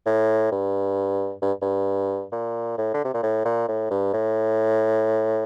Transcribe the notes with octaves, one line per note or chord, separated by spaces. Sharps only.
A2
G2
G2
G2
A#2
A2
D3
C3
A#2
A2
A#2
A2
G2
A2